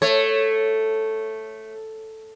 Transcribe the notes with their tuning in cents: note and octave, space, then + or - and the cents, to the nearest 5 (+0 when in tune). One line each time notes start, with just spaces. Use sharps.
A3 +0 C#5 -10